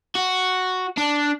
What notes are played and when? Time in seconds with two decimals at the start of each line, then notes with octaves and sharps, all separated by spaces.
0.16 F#4
0.98 D4